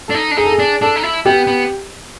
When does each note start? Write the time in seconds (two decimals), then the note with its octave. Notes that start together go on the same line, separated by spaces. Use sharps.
0.08 D4 A4
0.14 D#4
0.31 D4
0.37 D#4 G#4
0.45 A4
0.52 G#4
0.59 D4
0.82 D4 A4
0.96 D#4
1.03 E4
1.26 B3 G4
1.47 B3